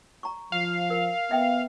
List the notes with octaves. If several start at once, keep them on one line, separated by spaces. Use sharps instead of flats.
A#5 C#6
F3 F5
A#4
B3 E5 G5